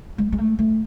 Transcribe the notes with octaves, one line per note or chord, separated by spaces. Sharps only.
G#3
G#3
A3
A3